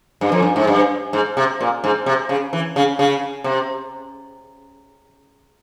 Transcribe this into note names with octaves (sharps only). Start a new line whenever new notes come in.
G2
F2
G2
G#2
G2
G#2
C3
A#2
G#2
C3
C#3
E3
C#3
C#3
C3